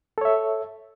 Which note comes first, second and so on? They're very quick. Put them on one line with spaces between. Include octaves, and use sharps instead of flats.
A4 C#5 E5